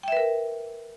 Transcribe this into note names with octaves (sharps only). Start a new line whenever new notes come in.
A#4 B4 E5 G5